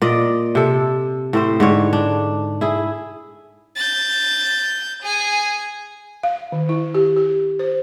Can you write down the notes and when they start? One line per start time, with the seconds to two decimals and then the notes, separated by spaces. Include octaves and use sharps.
0.01 A#2 D5 D#5
0.55 C3 A4
1.33 A2 C4 C5
1.60 G#2 D3 C#5
1.93 D4
2.61 E4 G#4
3.76 G6 A6
5.03 G#4 G#5
6.23 F5
6.52 D#3
6.69 E4
6.95 G4
7.16 G4
7.59 C5